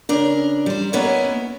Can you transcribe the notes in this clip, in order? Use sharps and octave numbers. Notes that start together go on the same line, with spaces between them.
C#3 D4 A#4
G3 C5
A#3 B3 C#4 E4 B4 D#5